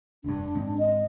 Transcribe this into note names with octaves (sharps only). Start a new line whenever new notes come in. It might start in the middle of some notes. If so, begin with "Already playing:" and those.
F1 G2 D4
G#2 G#3 C4
D#5